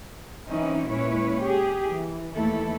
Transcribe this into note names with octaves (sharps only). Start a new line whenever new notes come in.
E3 C4 C#4 D#4 E4
A#2 G#3 C#4 E4 B4 C#5
G4 G#4
E3
D#2 E3 A3 E4 A4